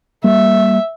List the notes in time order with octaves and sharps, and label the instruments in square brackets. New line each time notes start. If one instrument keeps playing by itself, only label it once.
[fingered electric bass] G3 A#3 [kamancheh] E5